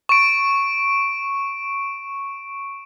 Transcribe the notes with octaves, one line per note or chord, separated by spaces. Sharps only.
C#6 D7